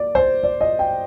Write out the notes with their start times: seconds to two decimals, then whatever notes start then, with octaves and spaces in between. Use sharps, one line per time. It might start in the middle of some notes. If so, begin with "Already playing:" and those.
Already playing: A#3 D5
0.15 C5
0.43 D5
0.61 D#5
0.79 G5